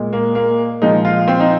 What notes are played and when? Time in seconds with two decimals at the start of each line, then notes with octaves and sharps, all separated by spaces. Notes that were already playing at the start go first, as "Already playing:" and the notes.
Already playing: A#2 G#3
0.13 A#3
0.35 A#3
0.82 A#2 F3 G#3 D#4
1.05 F4
1.28 C4
1.40 D#4